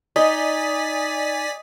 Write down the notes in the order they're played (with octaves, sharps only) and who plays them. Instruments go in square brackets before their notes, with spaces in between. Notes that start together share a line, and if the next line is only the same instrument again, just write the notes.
[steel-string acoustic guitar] D#4 [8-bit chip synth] D5 G#5 B6 [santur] D#5